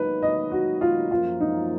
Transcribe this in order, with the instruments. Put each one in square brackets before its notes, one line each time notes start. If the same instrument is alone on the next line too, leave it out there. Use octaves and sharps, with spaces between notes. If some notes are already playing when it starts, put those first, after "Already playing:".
Already playing: [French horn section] D#3 F#3 A#3 D#4 [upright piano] B4
[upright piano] D#5
F#4
F4
[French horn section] F#2 F3 A#3 [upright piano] F4
[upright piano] D#4